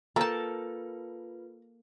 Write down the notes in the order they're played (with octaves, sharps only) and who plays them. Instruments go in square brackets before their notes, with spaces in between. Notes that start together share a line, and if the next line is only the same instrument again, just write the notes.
[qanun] A#3 A5 [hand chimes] F4 B4 [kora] A4 G5 [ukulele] A#5